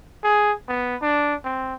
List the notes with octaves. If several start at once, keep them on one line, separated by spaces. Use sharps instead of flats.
G#4
B3
D4
C4